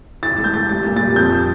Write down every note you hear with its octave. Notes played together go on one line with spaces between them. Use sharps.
E3 A6
A3
G6
A3 A6
G3 A6
A#2
G3 A6
F2 G6